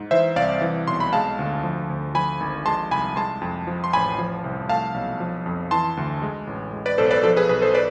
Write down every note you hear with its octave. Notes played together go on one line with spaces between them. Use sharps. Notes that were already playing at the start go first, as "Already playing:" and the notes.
Already playing: G#2
E3 C5 E5
C2 D5 F5
E3
B1 C6
B5
G#3 F5 A5
D2
F3
D2
F3 G#5 B5
G#1
G#3 A5 C6
C2 G#5 B5
G#3 A5 C6
F2
F3
C6
A1 G#5 B5
F3
C2
A3 F5 A5
B1
F3
F2
E3 A5 C6
D2
G#3
A1
G#3
B4 D5
B1 A4 C5
B4 D5
F3 A4 C5
G#4 B4
B1 G#4 B4
A4 C5
B4 D5